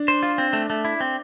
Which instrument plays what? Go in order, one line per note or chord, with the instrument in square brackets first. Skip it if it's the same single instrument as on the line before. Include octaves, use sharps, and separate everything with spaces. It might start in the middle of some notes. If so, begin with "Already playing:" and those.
Already playing: [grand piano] D4
[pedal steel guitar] C5
F4
C4
A3
A3
E4
C4